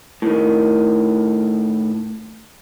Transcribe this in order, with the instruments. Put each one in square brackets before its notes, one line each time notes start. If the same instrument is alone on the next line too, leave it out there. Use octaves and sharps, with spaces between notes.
[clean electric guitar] A2 D#3